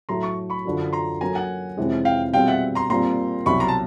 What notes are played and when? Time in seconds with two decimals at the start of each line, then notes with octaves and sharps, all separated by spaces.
0.09 A2 F#3 A3 A#5 C6
0.23 C#6
0.50 B5 C#6
0.65 F#2 D3 F3
0.93 A#5 C6
1.21 F#3 A#3 C#4 F#4 A4 G#5 A#5
1.35 F#5 G#5
1.77 F2 C3 E3 G#3 C#4
2.05 F5 G5
2.33 B2 G3 C4 F4 G#4 F5 G5
2.48 E5 F#5
2.75 A#5 C6
2.90 A#2 G3 C4 F4 A#5 C6
3.46 C2 B2 F#3 B5 C#6
3.60 A#5 C6
3.68 A5